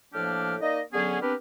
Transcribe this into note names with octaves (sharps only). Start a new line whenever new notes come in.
A2 F3 A#3 D4 G4 F6
A#3 D#4 D5 D#5
D3 F#3 B3 C#4 G#4
B3 C4 D4 G4 A#4 B4